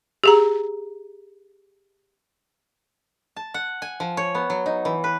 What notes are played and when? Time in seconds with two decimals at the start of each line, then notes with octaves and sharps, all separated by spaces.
0.24 G4 G#4 A#5
3.36 A5
3.54 F#5
3.82 G#5
4.00 F3
4.17 C#5
4.35 B3
4.50 F#3
4.66 D#4
4.85 E3
5.04 B4